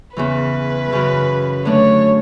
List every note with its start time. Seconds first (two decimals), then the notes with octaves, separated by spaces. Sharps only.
0.16 E2 C#3 E3 B4
0.90 F#2 C#3 E3
1.65 D3 F#3 A3 D4 C#5